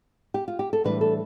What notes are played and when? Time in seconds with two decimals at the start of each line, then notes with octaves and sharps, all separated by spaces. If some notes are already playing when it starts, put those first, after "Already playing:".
0.34 G4
0.48 F4
0.59 G4
0.73 A4
0.84 A2 E3 G3 D4 B4
1.01 A4